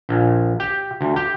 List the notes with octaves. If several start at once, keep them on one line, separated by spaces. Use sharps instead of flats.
A#1
G4
D2
G4